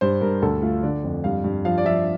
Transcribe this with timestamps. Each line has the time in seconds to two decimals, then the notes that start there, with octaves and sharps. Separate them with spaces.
0.01 G2 C5
0.21 G2 A#4
0.42 D2 A4
0.62 A3 F4
0.83 D3 D5
1.04 F2
1.24 G2 F5
1.44 G2
1.65 F3 F5
1.78 D5
1.85 F3 E5